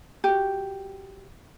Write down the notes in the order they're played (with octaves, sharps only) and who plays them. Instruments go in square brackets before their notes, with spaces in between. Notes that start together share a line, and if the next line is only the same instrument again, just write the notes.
[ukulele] F#4 G4